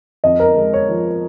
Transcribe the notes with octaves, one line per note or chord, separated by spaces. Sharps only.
F2 D#5
A#4
G#3
C#5
F3